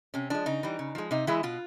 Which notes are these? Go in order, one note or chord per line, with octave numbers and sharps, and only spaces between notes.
C3 C#4
F3 G#3 D4
C#3 D#4
E3 G3
C#3
F3 G#3
C3 D#4
E3 G#3 E4
B2 F4